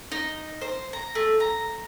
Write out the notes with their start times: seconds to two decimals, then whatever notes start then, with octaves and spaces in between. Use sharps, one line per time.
0.12 D#4
0.61 C5
0.93 A#5
1.15 A3
1.40 A#5